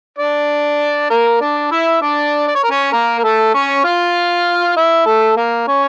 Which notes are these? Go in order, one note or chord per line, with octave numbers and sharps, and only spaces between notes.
D4 D5
A#3 A#4
D4 D5
E4 E5
D4 D5
D5
C#5
A#4
C#4 C#5
A#3 A#4
A#4
A3 A4
C#4 C#5
F4 F5
E4 E5
A3 A4
A#3 A#4
C#4 C#5